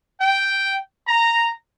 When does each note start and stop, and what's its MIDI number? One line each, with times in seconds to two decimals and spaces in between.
0.20 0.73 79
1.05 1.48 82